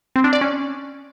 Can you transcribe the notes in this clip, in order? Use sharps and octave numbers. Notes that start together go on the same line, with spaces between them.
C4
D4
D5
C#4